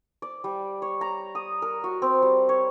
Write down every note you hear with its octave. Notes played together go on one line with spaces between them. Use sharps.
D5
G3
C#5
A#5
D#6
A#4
F#4
C4
G3
C#5